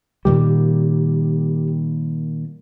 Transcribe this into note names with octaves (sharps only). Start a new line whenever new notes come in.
A#2 D#3 G3 G4